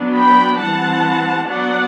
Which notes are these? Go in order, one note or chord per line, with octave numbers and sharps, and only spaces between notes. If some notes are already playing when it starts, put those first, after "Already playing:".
Already playing: F#3 B3 D4
G5 B5
E3 G3 C4 F#5 A5
F#3 B3 D4 D5 F#5